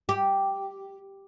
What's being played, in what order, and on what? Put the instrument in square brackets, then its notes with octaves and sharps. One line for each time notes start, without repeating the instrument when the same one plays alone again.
[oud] G4